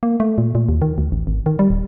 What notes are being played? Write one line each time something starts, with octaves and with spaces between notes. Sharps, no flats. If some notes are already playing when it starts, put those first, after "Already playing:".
A#3
A3
A#2
A#2
D#2
D#3
D2
A1
G#1
D#3
G3
D1